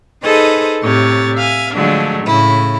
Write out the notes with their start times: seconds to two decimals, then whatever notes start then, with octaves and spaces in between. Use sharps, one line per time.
0.23 D#4 G#4 A4 B4 C5 D#5
0.82 A2 C3 C#5 A6
1.36 E5 F5 G#5
1.73 D3 F3 F#3 G#3 A3 D4
2.25 A2 C#3 E4